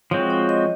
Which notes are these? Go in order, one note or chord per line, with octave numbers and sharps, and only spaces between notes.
F3 G#3 C4 F#4 C#5
C#5
D#5